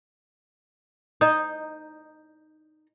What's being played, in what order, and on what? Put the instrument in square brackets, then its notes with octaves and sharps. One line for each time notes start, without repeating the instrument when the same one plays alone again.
[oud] D#4 [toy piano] D#5 A#5 D#6 [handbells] G6